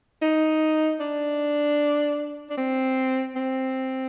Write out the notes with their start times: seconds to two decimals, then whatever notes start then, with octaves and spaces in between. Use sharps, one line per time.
0.22 D#4
1.01 D4
2.50 D4
2.57 C4
3.36 C4